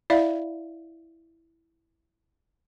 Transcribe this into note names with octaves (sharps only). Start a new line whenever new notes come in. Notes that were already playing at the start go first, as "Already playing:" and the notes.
E4 D5 E5 F5